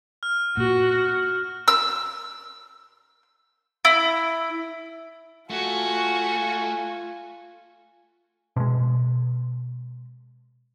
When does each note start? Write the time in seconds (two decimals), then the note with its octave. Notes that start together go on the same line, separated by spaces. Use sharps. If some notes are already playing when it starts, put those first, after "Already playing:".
0.23 F6
0.57 A#2 F#4
1.68 E6
3.85 E4
5.50 A3 F4 F#4 G#5
8.56 B2 G#3